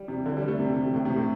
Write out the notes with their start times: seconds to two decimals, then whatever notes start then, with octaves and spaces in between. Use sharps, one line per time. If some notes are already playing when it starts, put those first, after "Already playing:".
Already playing: G3
0.08 C3
0.26 D3
0.37 G3
0.48 A3
0.60 C3
0.76 C3
0.94 A2
1.05 C3
1.16 A2